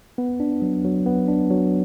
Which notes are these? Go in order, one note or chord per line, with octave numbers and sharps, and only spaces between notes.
B3
D4
F#3
F#3
B3
D4
F#3